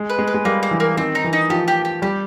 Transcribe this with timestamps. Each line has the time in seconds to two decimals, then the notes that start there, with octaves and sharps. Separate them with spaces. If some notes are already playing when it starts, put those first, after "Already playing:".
Already playing: G#3
0.10 B4
0.19 G#3
0.27 B4
0.34 G#3
0.45 G3 A#3
0.63 A#3
0.71 E3
0.80 A#3
0.97 D#3 C4
1.15 D#4
1.24 E3
1.33 D#4
1.50 F3 G4
1.68 G4
1.85 G4
2.02 G3 G4